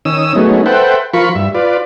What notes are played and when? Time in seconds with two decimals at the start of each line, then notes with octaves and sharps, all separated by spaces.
0.05 D#3 C#4 D#6 E6
0.35 F#3 G#3 A3 B3 C#4 D#4
0.66 A4 B4 C5 E5 F#5 G5
1.13 F3 F4 A#4 B5 C#6
1.35 G2 E5
1.55 F4 B4 D5